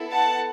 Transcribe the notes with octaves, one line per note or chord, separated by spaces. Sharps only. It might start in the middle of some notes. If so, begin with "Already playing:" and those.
Already playing: B3 E4 A4
F#5 A5